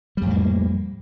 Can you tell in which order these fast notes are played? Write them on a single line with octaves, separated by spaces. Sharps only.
G3 F2 A2 A#3